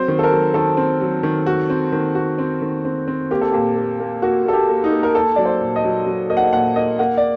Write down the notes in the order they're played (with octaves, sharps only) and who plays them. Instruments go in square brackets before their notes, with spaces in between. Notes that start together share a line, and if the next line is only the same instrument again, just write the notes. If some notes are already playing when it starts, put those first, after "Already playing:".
Already playing: [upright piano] F#3 C4 [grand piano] C5
[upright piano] D#3
[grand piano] A4
A#4
[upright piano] F#3
[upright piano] D#3 [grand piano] A4
[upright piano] C4
F#3
D#3
F#4
C4
D#3
F#4
C4
D#3
C4
C4
[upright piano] A#3 [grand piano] G4
[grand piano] A4
[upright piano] A#2 [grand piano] G4
[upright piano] A#3
A#3
[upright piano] A#3 [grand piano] F#4
[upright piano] A#3 [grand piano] A4
[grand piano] G4
[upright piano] A#3
[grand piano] D#4
[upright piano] A#3
[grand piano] A#4
[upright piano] A#3 [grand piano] A4
[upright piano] F#3 [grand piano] D5
[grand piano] C5
[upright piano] A#2
[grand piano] D#5
[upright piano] F#3
F#3
[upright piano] A#3 [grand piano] D#5
[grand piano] F#5
D#5
[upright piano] A#2 [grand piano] F#5
[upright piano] A#3 [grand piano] D#5
[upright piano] A#3 [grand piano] F#5
[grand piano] D5